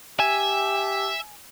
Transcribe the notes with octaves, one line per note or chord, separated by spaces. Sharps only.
G4 E5 G#5